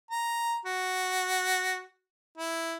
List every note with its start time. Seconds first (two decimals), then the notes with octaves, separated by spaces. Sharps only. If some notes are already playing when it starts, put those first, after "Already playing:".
0.11 A#5
0.66 F#4
2.38 E4